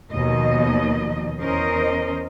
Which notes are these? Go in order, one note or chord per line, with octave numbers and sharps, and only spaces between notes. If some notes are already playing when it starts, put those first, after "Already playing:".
D#2 B2 F3 A#3 D#4 D#5
E2 C#4 A#4 C5 D#5